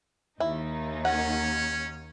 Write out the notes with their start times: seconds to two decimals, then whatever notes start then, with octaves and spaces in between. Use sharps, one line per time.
0.40 D#2 D#4 E4
1.05 C#4 C#5 F#5